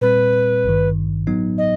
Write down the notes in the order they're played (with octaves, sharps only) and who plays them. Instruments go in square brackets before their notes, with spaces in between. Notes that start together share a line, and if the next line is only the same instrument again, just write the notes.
[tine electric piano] A#2 G3 C4 [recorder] B4
[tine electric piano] G#1 G2 D#3
A2 F#3 B3 D#4
[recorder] D#5